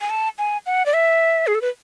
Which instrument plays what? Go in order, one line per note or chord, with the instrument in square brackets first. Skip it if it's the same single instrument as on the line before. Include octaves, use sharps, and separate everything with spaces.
[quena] G#5
A5
G#5
F#5
D5
E5
G#4
A4
B4